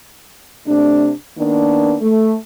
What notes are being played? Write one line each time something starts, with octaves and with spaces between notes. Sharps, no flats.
C3 A3 D4
D#3 A#3 B3 D4
A3